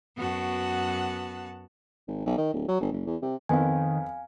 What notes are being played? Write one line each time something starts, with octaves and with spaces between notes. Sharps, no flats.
F#2 B3 F#4 F#5 A5
G#1
B1
D#3
D1
F#3
G1
F#1
E2
C3
F2 D#3 B3 C4 F5 G#5